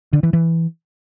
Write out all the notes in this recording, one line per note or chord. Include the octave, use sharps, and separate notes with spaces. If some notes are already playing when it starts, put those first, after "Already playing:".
D3
E3
E3